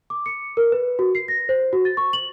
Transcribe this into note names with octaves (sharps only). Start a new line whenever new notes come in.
D6
C#7
A#4
B4
F#4
C7
A#6
C5
F#4
A6
C#6
F#7